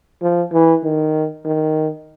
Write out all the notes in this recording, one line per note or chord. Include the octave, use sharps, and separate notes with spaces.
F3
E3
D#3
D#3